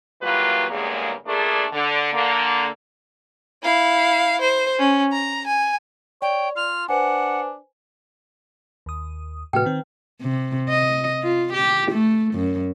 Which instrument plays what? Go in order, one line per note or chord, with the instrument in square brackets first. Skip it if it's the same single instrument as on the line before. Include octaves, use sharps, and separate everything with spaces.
[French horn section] E3 F#3 G3 A#3 F4 B4
E2 G2 C#3 G#3 A#3
A#2 A3 D4 G#4 A#4 D5
D3
D3 A#3
[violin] E4 F5
C5
C#4
A#5
G#5
[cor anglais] C#5 [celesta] D5 [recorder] G5
[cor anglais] F4 [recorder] F6
[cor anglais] D4 [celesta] B4 C5 G#5 [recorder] F#5
[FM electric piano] D#2 D#6
[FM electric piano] A2 C3 F#4 [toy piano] B4 G5
[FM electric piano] D#3 C4
[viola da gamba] C3
D#5
F4
G4
A3
F#2